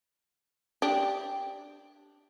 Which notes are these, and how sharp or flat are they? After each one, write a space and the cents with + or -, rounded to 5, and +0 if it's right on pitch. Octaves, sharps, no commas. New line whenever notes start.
D4 +0 G4 +0